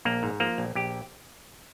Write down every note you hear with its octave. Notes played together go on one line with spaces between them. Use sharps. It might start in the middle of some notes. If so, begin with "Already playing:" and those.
A#1 A#3
G#2
F3 A#3
A#1
A#1 G4